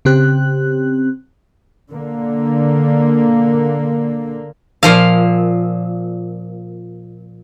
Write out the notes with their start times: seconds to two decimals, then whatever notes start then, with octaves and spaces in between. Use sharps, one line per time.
0.05 C#3 C4 G4 F#6
1.91 D3 A#3
4.83 A#2 F3 F5